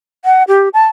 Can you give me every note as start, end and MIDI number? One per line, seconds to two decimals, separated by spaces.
0.25 0.43 78
0.48 0.69 67
0.74 0.87 81